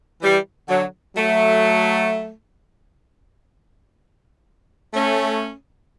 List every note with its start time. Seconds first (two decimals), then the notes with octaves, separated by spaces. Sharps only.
0.22 E3 G3
0.69 D3 F#3
1.16 F#3 A3
4.94 A3 C#4